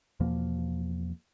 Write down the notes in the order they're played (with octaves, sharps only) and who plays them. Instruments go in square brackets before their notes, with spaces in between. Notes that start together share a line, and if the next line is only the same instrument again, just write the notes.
[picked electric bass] E2 B2 F3 A#3